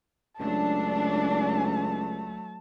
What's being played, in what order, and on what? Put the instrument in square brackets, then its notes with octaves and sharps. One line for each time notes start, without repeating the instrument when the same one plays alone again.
[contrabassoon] C#2 [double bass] F#3 A3 [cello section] D4 [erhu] A5